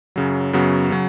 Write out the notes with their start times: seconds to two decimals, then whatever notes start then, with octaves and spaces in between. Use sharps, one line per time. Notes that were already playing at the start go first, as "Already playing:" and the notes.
0.16 F#2 C#3 F#3
0.53 F#2 C#3 F#3 B3 F#4
0.90 C#3 F#3